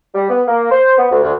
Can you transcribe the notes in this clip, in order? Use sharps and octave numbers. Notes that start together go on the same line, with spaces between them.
G3
B3
A#3
C5
B3
D2
D2